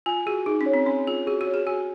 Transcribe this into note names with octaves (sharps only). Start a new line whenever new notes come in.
F4 G#5
F#4 G#4
D#4 G#4
C#4
C#5
C4
C#4 G#5
F4 G#4
F#4 G#4
F#4
C#5
G#4
F#4 G#5